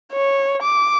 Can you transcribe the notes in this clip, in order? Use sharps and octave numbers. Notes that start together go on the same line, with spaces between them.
C#5
D6